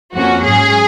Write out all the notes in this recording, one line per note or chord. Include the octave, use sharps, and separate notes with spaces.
F2 F3 A#3 C#4 F#4
G#2 F#3 C#4 G#4